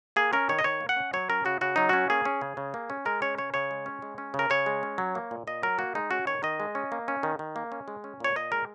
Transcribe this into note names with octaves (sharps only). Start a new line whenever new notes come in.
A#3 G#4
C#4 A#4
D#3 C#5
D#5
D#3 C#5
A#3
F#5
C#4
F#3 C#5
C#4 A#4
C#3 F#4
C#3 F#4
F#3 D#4
C#4 F#4
A#3 G#4
C#4
C#3
C#3
A#3
C#4
G#3 A#4
C#4 C#5
C#3 C#5
C#3 C#5
G#3
C#4
G#3
C#4
C#3
A#4
C#3 C#5
G#3
C#4
F#3
A#3
A#2
A#2 D#5
F#3 A#4
A#3 F#4
G#3 D#4
C#4 F#4
D#3 C#5
D#3 D#5
G#3
C#4
A#3
C#4
D#3
D#3
A#3
C#4
G#3
C#4
A#2 C#5
A#2 D#5
G#3 A#4